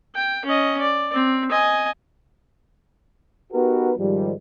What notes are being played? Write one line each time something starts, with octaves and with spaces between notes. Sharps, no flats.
G5
C#4 D#5
D5
C4
D#5 G#5
B3 D#4 F#4 G4 A#4 B4
G#2 D#3 F3 G3